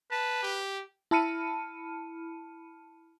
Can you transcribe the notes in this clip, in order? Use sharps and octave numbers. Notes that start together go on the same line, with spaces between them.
B4 A5
G4
E4 A5 B5 F6 C#7 D#7